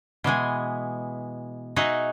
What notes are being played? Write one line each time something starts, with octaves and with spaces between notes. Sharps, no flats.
B2 E3 G#3 G#5
D#4 F#4 G#4 D#5 E5